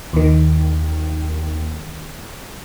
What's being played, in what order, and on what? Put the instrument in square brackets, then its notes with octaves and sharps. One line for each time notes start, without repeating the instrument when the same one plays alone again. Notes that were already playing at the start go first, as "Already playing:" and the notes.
[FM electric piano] D#2 D#3